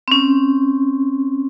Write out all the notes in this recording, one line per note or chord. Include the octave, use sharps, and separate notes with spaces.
C4
C#4